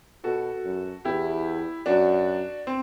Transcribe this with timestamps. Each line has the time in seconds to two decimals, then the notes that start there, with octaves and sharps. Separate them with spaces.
0.24 B2 F#4 A4
0.65 F#2
1.05 E2 E4 G4
1.86 F#2 D4 F#4
2.67 C4